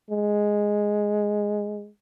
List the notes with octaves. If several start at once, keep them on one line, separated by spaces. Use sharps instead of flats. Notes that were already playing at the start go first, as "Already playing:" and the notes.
G#3